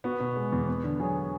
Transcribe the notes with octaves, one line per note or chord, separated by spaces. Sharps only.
B3 F#4
B2
G#3
E2
B3
D3
F#3 G#4